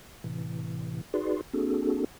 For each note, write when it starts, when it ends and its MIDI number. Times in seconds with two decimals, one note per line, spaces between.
0.24 1.01 45
0.24 1.01 48
0.24 1.01 52
1.14 1.41 63
1.14 1.41 66
1.14 1.41 68
1.14 1.41 71
1.14 1.41 74
1.14 1.41 84
1.53 2.04 58
1.53 2.04 60
1.53 2.04 62
1.53 2.04 66
1.53 2.04 68
1.53 2.04 69